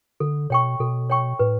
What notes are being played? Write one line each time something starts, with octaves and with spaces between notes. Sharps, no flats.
D3 A4
B2 C#5 G5 C#6
B2 A4
C#5 G5 C#6
A2 B4